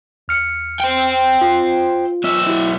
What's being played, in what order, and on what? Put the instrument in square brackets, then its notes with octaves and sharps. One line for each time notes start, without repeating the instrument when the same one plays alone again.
[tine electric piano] E2 F6 C#7
[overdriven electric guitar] C5 G5
[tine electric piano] F4
[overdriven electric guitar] B1 E5
[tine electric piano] E4 F#4